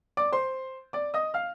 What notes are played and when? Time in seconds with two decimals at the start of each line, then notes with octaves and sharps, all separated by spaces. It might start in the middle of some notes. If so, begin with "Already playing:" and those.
0.17 D5 D6
0.32 C5 C6
0.93 D5 D6
1.14 D#5 D#6
1.34 F5 F6